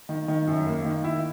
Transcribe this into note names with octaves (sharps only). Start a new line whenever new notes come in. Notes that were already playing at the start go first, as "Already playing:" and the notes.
D#3
D#3
F#2
A#3
D#3
E4